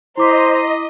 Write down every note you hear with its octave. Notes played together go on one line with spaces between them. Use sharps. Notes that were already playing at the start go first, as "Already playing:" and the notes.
E4 C5 D#5 A#5 C6 D6 B6